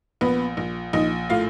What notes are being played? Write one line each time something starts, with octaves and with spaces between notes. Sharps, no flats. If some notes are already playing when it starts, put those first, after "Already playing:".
A#1 B3 B4
A#1
A#1 D#4 D#5
A2 F4 F5